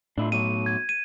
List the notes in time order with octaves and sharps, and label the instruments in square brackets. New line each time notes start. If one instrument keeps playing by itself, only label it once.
[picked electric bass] A2 [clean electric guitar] D4 E4 F4
[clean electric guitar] B2 F#3 C#5 [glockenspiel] D#7
[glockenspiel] G#6
D#7